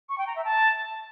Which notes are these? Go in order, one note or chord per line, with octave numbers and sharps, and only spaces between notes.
C#6
G5
A#5
E5
A5